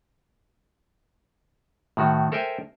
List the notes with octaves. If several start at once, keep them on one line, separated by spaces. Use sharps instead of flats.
A2 D#3 F#4
A4 A#4 C5 E5 G5 G#5